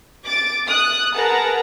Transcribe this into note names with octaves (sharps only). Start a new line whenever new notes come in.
D6 A6 D7
D#6 F#6
G#4 A#4 B4 F#5 A5 A#5